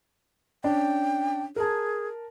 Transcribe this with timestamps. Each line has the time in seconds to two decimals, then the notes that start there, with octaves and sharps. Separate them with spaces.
0.64 C#4 D4 G5
1.56 G#4 A#4 A5